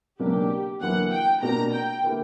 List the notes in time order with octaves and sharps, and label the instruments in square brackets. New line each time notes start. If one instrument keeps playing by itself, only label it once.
[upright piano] C#2 B2 F#3 A#3 D4 [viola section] G4
[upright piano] E2 D3 F#3 A#3 E4 [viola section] F#5
[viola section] G5
[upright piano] B2 A#3 D4 F#4 [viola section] A#5
[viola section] G5
[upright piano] D3 A#3 E4 G4